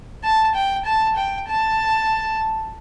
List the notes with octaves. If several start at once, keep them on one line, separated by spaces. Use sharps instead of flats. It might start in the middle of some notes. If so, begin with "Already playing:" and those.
A5
G5
A5
G5
A5